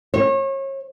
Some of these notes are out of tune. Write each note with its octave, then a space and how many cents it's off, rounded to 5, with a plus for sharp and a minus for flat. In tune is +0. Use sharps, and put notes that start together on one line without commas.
C#5 -35